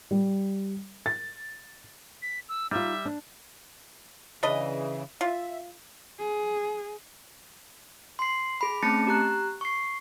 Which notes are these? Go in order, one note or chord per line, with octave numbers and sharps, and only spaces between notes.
G3
A6
B6
E6
G3 D#4 F4 E5
D4
C#3 E3 D4 B4 D#5
F4 E5
G#4
C6 C7
G#4 B5
A3 C4 C#4 A5 A6 C#7
G4 A#5 F#6
C#6 C7